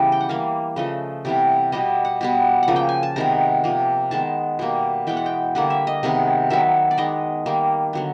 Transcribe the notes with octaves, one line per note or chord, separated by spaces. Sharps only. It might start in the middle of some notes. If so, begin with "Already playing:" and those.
Already playing: C#3 E3 G3 B3
G5
F#5
E3 G3 A#3 F5
C#3 F3 A3 D#5
C3 E3 G3 B3
B2 G3 B3 D#5
F#5
B2 G3 B3
F#5
C#3 F3 A#3
G5
G#5
A5
C3 D#3 G#3 B3 A#5
C3 F3 A#3
D#3 G#3 B3 A5
B2 G3 A#3
E3 G#3 B3 G5
F#5
G5
D3 G3 A#3 F#5
E5
D#5
C3 D#3 G#3 B3
D#3 F#3 B3 E5
D5
D#3 G#3 B3 D#5
D#3 G3 A#3
D3 F#3 B3